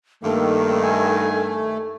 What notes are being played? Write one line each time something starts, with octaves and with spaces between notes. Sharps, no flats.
G2 D#3 A3 A#3 A4
G#5